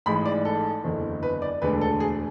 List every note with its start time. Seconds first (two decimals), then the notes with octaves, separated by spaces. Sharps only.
0.06 A1 G#2 G#3 B5
0.26 D5
0.45 A4
0.84 F#1 E2 D3
1.23 B4
1.42 D5
1.62 E1 D2 D3 G#3 D4 B4
1.81 A4
2.00 G#4